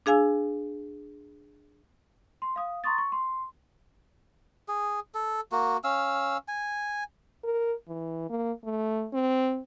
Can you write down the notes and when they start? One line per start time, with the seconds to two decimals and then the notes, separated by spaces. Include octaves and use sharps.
0.06 D4 G#4 F5 G#5 E6
2.42 C6
2.56 F5 D#6
2.84 A#5 C6 C#6 D#6 A6
2.98 C#6
3.12 C6
4.68 G#4
5.14 A4
5.52 A#3 F#4
5.84 C#4 F5 E6
6.48 G#5
7.44 A#4
7.88 E3
8.30 A#3
8.65 A3
9.13 C4